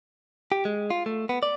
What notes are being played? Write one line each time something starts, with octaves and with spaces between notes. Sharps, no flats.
G4
G#3
F4
A3
B3
D5